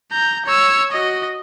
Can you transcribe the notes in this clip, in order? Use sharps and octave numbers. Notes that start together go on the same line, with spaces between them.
A#5 G6
C#5 E6
F#4 D#5